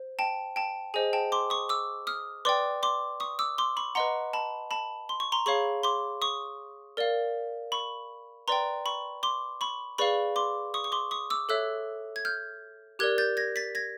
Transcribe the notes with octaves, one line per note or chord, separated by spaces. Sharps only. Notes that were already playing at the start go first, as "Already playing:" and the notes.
Already playing: C5
G5 A5
G5 A5
G#4 C5 D#5 G#5
G5 A5
C6 D6
C#6 D#6
D6 E6
D#6 F6
B4 D5 G5 C6 D6
C6 D6
C#6 D#6
D6 E6
C6 D6
B5 C#6
B4 D#5 F#5 A#5 C6
A5 B5
A5 B5
C6
C#6
A#5 C6
G#4 C#5 F5 B5 C#6
C6 D6
C#6 D#6
A#4 D5 F5
B5 C#6
B4 D5 G5 A#5 C6
B5 C#6
C6 D6
B5 C#6
G#4 B4 D5 F5 B5 C#6
C6 D6
C#6 D#6
C#6
C6 D6
C#6 D#6
D6 E6
A4 C#5 E5 E6 F#6
G#6
F6 G6
G4 A#4 D5 F#6 G#6
G6 A6
G#6 A#6
A6 B6
G#6 A#6